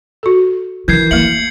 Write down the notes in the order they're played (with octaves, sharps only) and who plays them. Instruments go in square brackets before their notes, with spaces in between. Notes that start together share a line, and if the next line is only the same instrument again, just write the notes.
[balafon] F#4 A4
[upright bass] D#3 [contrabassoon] E3 [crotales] G6 G#6 C7
[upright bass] A3 E4 [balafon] A#3 E5 [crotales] C#7 F#7